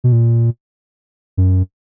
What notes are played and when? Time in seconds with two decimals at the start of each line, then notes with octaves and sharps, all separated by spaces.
0.04 B2
0.12 A#2
1.37 F#2